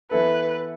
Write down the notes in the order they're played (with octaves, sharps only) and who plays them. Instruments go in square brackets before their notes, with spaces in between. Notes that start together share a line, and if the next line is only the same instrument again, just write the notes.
[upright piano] E3 B3 E4 A4 [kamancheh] B4